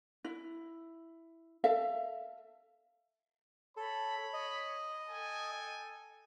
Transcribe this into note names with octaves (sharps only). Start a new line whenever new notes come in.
E4
A4 E5 F5
A4 C#5 B5
D#5
A4 G5 G#5